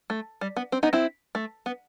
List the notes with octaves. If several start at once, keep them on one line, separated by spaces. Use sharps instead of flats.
A3
G3
B3
C4
B3 D#4
C4 E4
A3
B3